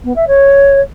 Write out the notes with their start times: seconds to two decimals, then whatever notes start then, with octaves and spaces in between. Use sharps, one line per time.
0.04 B3
0.16 E5
0.27 C#5